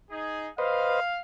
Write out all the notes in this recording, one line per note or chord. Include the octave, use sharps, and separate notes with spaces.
D#4 G#4
B4 C5 D#5 F5